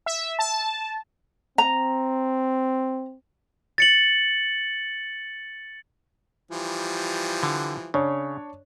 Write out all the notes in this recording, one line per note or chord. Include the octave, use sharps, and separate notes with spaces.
E5
A5
C4 A#5
A6 C#7 F#7
E3 F3 G3
D3
C#3 D4 C#5